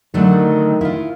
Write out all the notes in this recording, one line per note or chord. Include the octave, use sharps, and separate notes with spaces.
D3 D#3 F#3 A3
E4 F4